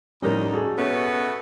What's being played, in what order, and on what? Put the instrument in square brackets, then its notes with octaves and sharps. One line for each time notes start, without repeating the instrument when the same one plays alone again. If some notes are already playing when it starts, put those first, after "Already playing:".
[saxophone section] D2 D3 D#4 [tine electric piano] A2 F3 C#4 [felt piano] G3 A#4
[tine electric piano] F#4 [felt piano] G#4 A4
[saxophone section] B2 A3 B3 [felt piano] C#4